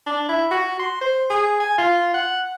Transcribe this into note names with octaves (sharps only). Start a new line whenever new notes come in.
D4
E4
F#4
C6
C5
G#4
G#5
F4
F#5